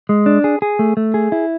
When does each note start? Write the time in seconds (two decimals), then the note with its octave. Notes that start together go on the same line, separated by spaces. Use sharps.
0.09 G#3
0.26 D4
0.44 G#4
0.62 G#4
0.79 A3
0.97 A3
1.14 G#4
1.32 E4